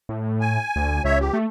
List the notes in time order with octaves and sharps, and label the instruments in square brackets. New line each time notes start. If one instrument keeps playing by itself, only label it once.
[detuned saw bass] A2
[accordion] G#5
[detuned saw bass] D2
[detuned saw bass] C#2 [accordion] C#5 E5
[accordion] G4
[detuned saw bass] A3